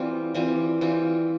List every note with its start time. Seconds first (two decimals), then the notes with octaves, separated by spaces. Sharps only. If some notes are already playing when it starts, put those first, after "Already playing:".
Already playing: E3 G3 C4 F4
0.34 E3 G3 C4 F4
0.81 E3 G3 C4 F4